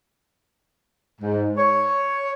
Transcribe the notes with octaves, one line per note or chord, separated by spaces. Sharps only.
G#2
C#5